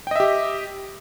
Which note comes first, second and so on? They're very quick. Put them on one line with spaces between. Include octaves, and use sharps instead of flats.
G5 D#5 E5 G4